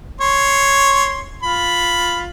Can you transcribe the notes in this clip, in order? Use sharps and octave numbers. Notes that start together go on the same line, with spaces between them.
C#5 C6
F4 B5